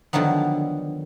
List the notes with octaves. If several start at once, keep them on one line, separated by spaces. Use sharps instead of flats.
D3 D#3 F3 F#3 B3